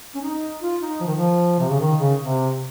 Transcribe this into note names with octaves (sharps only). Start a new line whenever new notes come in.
C#4
D#4
F4
D#4
F3
D#3
F3
C3
C#3
D#3
C#3
C3